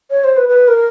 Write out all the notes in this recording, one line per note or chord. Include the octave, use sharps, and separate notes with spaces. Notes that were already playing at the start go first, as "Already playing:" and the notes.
C#5
C5
B4
B4
A#4